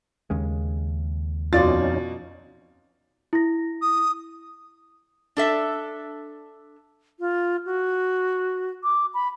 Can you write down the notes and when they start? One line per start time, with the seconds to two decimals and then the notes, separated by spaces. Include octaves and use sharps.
0.30 D#2 C#3 G#3
1.53 F2 B2 C#4 D#4 F4 D5 A6
3.33 E4 A#6
3.82 D#6
5.37 D4 A4 E5
7.20 F4
7.66 F#4
8.83 D6
9.14 B5